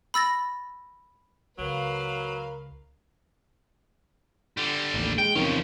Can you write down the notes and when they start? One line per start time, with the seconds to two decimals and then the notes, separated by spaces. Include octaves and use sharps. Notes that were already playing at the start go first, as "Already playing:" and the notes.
0.14 B5 E6 A6 A#6
1.58 C#2 F#3 A#4 B4 F5
4.57 D3 G3
4.94 A1 D#2
5.18 G#3 G5
5.35 E2 C3 D#3 F3 C#4